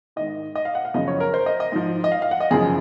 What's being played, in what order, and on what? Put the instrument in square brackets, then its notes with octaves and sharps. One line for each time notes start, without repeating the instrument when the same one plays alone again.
[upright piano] G#2 D#3 D#5
D#5
F5
F#5
F5
F#2 C#3 F3 D#5
C#5
A#4
C5
D#5
D#5
G#2 F3
D#5
F5
F5
F#5
D#5
F#2 C#3 F3 G#4